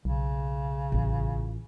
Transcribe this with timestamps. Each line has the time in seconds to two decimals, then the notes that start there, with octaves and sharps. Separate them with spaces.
0.05 B1 C#3
0.92 A1 F4